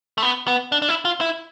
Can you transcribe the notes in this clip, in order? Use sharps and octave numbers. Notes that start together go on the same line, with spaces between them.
A3
B3
B3
D4
D4
E4
F4
E4